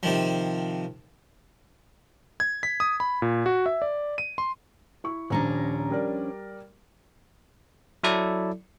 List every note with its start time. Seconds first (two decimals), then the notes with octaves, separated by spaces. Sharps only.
0.03 C3 D#3 F3
2.40 G#6
2.63 B6
2.80 D#6
3.00 B5
3.22 A#2
3.46 F#4
3.66 E5
3.82 D5
4.18 D#7
4.38 C6
5.04 E4 C#6
5.30 D#1 F3 C#4 D4 A#5
5.90 G3 A#4 D5
8.04 F#3 E4 A4 D5